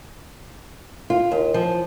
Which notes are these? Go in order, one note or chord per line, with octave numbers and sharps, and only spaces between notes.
F4
D#2
F3